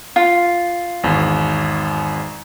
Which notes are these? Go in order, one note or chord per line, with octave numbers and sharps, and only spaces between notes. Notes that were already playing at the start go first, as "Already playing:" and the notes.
F4
G#1 E2